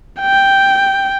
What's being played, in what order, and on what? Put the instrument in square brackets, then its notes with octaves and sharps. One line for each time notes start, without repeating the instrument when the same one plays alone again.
[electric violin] G5